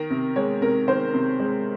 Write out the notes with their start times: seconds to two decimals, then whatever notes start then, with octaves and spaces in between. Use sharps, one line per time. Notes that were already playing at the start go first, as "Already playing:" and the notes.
Already playing: D#3 A#4
0.10 C3
0.36 G#3 C#5
0.61 C3 A#4
0.88 D#3 C5
1.14 C3
1.40 G#3